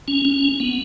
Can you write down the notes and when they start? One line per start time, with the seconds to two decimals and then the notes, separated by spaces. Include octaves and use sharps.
0.08 C#4
0.25 C#4
0.60 B3